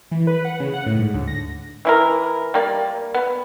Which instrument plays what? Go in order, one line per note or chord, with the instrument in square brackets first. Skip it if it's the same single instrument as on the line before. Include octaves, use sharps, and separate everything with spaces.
[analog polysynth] E3
B4
F#5
C#3
F#5
A2
G#2
D2
A#6
[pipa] E3 E4 A#4
G3 A#3 D5
B3